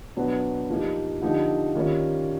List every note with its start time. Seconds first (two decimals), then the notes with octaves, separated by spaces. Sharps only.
0.16 B2 F#3 B3 D4
0.69 F3 A#3 D#4 G4
1.22 D3 F3 A#3 D#4 G4
1.75 D#3 G3 A#3 C#4 F4